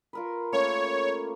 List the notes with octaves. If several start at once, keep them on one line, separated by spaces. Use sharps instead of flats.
F4 A#4 B4
A3 A#3 C#4 C#5